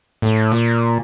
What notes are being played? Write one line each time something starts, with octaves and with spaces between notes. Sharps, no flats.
A2
A#2